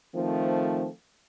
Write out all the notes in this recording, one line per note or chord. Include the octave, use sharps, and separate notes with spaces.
D#3 F3 A3 C4 A4